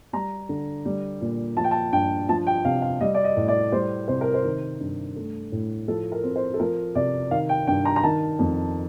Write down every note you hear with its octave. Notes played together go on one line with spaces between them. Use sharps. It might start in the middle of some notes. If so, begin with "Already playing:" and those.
G3 A#5
D3
G3
A#2
F3 A5
G5
A5
G2 G5
F3 A5
G5
C3 F5
F5
G3 D#5
D5
D#5
A2
D5
G3 C5
C3 C5
A#4
C5
D#3
G2
A3
A2
F3 A4
A#4
C4
C5
A4
F3 A#4
C3 D5
D#3 F5
G5
G2 G5
A#5
A#5
D#3 A5
F2